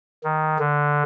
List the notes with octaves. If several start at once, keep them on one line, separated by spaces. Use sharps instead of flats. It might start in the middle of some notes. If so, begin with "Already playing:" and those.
D#3
D3